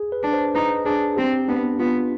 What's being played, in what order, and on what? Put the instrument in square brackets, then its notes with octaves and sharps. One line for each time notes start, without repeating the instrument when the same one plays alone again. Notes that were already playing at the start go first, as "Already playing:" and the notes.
Already playing: [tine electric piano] G#4
B4
[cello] D4
[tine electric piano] C5
[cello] D#4 [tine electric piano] B4
[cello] D4 [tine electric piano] G#4
[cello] C4 [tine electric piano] G4
[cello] B3 [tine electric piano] D4
[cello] B3 [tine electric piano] F4